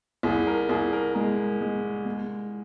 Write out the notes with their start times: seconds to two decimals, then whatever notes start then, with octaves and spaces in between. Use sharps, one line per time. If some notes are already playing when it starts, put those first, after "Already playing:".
0.23 C2 G#4
0.47 A#4
0.69 C2 G#4
0.93 A#4
1.15 G#3 A#4
1.61 G#3
2.05 G#3